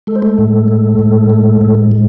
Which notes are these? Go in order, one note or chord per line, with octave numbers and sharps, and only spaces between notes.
G#3 A4
C5
A3 A4
A2
G#3
A2
G#3
A2
G#3